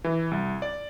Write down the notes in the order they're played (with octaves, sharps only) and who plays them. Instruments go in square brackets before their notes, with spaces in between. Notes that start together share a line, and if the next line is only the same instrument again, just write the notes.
[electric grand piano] E3
C2
D5